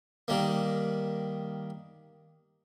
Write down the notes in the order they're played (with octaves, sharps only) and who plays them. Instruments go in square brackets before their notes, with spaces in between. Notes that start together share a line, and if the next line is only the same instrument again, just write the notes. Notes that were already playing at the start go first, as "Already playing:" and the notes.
[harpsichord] D#3 G3 A#3